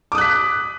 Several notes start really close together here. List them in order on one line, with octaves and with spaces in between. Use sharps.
D6 D#6 F#6 B6